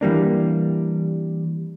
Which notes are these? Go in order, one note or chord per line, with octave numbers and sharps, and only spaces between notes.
E3 G3 A#3 D4